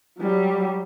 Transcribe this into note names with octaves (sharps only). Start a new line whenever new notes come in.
F#3 G3